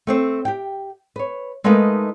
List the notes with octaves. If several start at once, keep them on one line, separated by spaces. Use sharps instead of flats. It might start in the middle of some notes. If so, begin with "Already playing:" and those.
A3 C4 C5
G4 G5
B4 C#5
G#3 A3 D#4 A#4 B4 F5